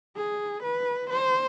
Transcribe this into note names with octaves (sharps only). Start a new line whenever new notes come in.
G#4
B4
C5